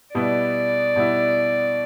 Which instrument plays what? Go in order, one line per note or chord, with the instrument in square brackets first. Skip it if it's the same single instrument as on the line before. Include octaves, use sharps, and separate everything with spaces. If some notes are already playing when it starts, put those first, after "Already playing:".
[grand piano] B2 G3 B3 E4 [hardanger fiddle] D5
[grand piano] B2 G3 B3 E4